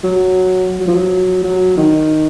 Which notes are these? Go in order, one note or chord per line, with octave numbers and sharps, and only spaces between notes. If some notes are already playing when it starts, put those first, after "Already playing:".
F#3
F#3
F3
F#3
F#3
D#3